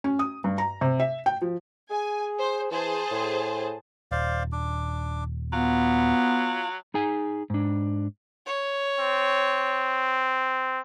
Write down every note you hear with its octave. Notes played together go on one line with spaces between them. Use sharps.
C#4
D#6
G2
A#5
C3
E5
G5
F3
G#4 G#5
C5
E3 G#4 C5 A5
A2
D#1 C5 D5 F5
D4 D6
F#3 B3 F4
D#4 G#4 G#5
G#2 D4
C#5
C4